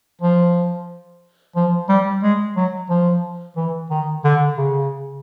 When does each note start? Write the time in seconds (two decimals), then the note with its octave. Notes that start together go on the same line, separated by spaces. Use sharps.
0.22 F3
1.56 F3
1.89 G3
2.23 G#3
2.56 F#3
2.90 F3
3.56 E3
3.90 D#3
4.24 D3
4.57 C#3